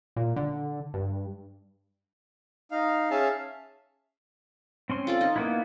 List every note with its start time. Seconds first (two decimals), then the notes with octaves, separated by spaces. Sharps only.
0.16 A#2
0.36 D3
0.94 G2
2.71 D#4 F5
3.11 C#4 G#4 E5 F5 A5
4.90 C4 C#4 C6
5.07 F4 A4 D5
5.21 D#4
5.36 A#3 B3 E4